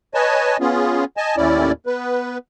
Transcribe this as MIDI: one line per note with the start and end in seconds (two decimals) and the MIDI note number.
0.14 0.57 71
0.14 0.57 73
0.14 0.57 75
0.14 0.57 80
0.14 0.57 81
0.61 1.04 59
0.61 1.04 61
0.61 1.04 65
0.61 1.04 68
1.17 1.36 75
1.17 1.36 80
1.17 1.36 81
1.37 1.72 39
1.37 1.72 45
1.37 1.72 61
1.37 1.72 64
1.37 1.72 74
1.86 2.38 59
1.86 2.38 71